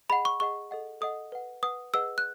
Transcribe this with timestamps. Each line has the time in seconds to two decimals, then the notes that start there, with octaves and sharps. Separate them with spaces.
0.09 G#4 D#5 F#5 B5
0.25 C#6
0.40 G#4 D#5 F#5 C#6
0.71 A4 D#5 F#5
1.01 A4 D#5 F#5 D#6
1.32 B4 F#5
1.63 B4 F#5 D#6
1.93 G#4 B4 D#5 F#5 E6
2.18 F#6